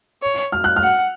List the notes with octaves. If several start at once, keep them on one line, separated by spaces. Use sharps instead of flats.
C#5
F6
F#6
F6
F#5